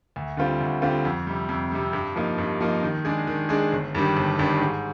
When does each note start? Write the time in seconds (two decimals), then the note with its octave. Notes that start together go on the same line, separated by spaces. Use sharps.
0.16 D2
0.37 D3 G3 C4 F4
0.61 D2
0.82 D3 G3 C4 F4
1.05 F2
1.27 C3 G3
1.49 F2
1.72 C3 G3
1.93 G2
2.16 F3 A#3 D#4
2.38 G2
2.61 F3 A#3 D#4
2.83 D#3
3.05 G#3 D4 G#4
3.27 D#3
3.49 G#3 D4 G#4
3.72 G1
3.95 G2 D#3 G3 D4
4.17 G1
4.38 G2 D#3 G3 D4
4.61 G#2